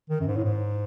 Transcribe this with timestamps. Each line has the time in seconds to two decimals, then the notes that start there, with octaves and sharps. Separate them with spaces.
0.10 D#3
0.21 F#2
0.28 G#2
0.36 A2
0.44 G#2